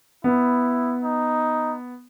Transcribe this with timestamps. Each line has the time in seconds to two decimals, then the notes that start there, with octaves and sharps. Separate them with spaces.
0.24 B3 E4
1.03 D#4